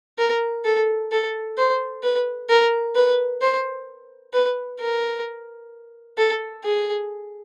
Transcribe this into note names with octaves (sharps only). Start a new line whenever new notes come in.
A#4
A4
A4
C5
B4
A#4
B4
C5
B4
A#4
A4
G#4